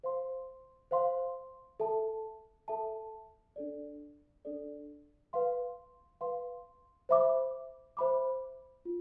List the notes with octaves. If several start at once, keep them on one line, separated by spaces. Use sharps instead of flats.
C5 F5 C6
C5 F5 C6
A4 E5 A5
A4 E5 A5
D4 A4 D5
D4 A4 D5
B4 F5 C6
B4 F5 C6
C5 E5 B5 D6
C5 E5 B5 D6
F4